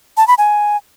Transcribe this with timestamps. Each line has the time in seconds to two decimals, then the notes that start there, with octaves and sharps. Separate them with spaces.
0.17 A5
0.28 B5
0.38 G#5